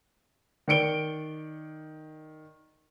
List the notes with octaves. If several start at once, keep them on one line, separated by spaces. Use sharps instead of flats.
D#3 D5 C#7 D7 G7